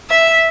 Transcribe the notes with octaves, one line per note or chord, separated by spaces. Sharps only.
E5